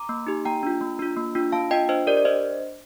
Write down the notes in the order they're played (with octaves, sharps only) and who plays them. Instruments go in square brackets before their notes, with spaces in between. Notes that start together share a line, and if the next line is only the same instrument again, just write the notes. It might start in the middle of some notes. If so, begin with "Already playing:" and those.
Already playing: [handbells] A#5 D6
A#3
D#4 G4
A#3 G5 A#5
D4 F4
A#3
D4 F4
A#3
D4 F4
A#3 F5 A5
D4 F4 D#5 G5
D4 C5 D#5
G4 A#4 D5
D5
D4 C5 D#5